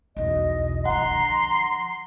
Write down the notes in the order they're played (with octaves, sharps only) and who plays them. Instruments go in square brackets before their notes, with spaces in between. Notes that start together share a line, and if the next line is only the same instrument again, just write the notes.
[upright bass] B1 E2 [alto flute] D#5
[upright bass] D3 F3 [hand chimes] F#5 [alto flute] A#5 [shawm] C6